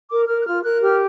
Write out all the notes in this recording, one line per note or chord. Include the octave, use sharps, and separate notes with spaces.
A#4 D6
A#4 F6
F#6
F4 F6
A#4 F#6
G4 F6